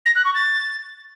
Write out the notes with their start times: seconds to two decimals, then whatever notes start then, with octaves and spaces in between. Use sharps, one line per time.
0.05 A#6
0.15 F#6
0.25 C#6
0.34 A6